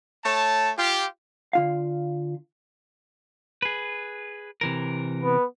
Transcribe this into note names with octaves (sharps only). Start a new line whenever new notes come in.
A3 C#5 A5
F4 G4
D3 F4 F5
G#4 B4
C3 E3 A#4
B3